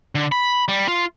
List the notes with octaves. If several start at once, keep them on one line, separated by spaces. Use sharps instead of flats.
D3
B5
G3
F4